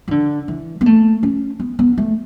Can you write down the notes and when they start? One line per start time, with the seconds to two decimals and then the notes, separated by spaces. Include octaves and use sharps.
0.08 E3
0.11 D3
0.48 E3
0.81 B3
0.86 A3
1.23 C#4
1.60 B3
1.79 B3
1.98 A3